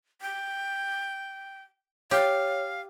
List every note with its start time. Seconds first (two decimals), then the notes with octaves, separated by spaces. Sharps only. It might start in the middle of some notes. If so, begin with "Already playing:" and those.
0.21 G5
2.11 G4 C#5 F5